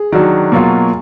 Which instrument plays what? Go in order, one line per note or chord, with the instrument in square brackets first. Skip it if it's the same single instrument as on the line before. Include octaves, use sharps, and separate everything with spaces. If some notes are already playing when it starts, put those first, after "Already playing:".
Already playing: [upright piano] G#4
[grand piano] D#3 F#3 D4 [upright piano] F#4
[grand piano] B2 F#3 A#3 F4